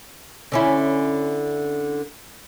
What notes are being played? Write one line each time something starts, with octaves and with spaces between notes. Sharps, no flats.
D3 C#4 E4